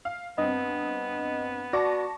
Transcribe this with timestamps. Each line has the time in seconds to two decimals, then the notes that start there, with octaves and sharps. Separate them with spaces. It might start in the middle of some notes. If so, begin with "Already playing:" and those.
0.05 F5
0.38 G2 B3 C4 D#5
1.73 F#4 D5 A5 C#6 A#6